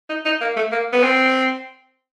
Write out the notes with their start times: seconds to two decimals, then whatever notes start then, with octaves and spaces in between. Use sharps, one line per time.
0.09 D#4
0.25 D#4
0.41 A#3
0.56 A3
0.72 A#3
0.93 B3
1.03 C4